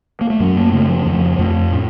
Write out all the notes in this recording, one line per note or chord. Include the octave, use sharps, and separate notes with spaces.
A#3
A3
F#2 F#3
A#3
C#3 A3
F3
F2 F3
F2 A3
A2